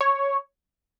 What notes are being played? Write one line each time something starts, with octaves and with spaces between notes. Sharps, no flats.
C#5